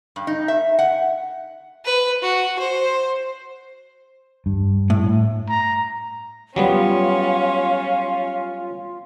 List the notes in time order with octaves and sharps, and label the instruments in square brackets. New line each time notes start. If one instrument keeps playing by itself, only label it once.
[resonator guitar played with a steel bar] G2
D#4
E5
F#5
[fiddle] B4
F#4
C5
[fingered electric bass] G2
[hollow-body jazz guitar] A2
[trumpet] A#5
[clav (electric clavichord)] F#3 G3 B3 [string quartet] C#4 [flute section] F4 [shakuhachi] F5